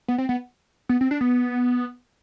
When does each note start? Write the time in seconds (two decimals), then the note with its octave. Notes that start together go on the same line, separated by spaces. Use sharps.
0.08 B3
0.18 C4
0.29 B3
0.89 B3
1.01 C4
1.11 D4
1.21 B3